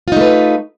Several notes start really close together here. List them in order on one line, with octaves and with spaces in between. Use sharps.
F4 D#4 A3 B4